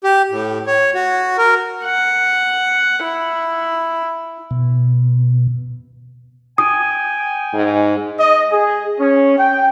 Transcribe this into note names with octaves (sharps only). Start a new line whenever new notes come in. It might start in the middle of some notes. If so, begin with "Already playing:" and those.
G4
A2
C#5
F#4
A#4
F#5
E4
B2
G5 G#5 D#6
G#2
D#5
G#4
C#4
G5